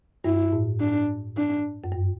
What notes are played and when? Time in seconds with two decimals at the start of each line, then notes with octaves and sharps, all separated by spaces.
0.24 G2 E4
0.52 A2
0.80 D4
1.37 D4
1.84 F#2
1.92 G2